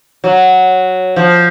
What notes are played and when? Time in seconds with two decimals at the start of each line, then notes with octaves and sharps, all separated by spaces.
0.24 F#3
1.16 F3